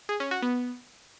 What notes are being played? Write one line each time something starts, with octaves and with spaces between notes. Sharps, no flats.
G#4
C#4
F#4
B3